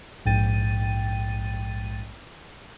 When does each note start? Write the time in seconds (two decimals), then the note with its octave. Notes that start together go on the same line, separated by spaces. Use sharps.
0.25 A#1 G#2 G5 A6 D#7